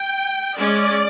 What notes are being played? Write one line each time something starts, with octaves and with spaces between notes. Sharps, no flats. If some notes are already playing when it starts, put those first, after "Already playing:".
Already playing: G5
G#3 C#4 D5